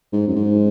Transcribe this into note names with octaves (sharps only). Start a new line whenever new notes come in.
G#2
F#2
G#2